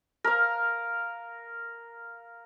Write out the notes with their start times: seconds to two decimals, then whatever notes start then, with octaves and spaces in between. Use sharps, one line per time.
0.24 A#4 F5